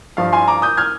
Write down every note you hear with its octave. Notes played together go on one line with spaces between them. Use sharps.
G2 F3 F5
G#5 C6
A#5 D6
D#6 G6
F6 G#6